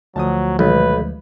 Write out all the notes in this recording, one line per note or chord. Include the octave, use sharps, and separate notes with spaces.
D2 F3 F#3 A5 D#6
B1 D#3 F#3 G#3 B4